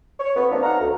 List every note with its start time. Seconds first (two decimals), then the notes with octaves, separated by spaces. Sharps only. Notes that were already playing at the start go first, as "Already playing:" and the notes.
0.20 C#5
0.36 F2 B3
0.50 F3 A3 A#3 C4 D4
0.63 D#4 F5 F#5 A#5
0.80 D2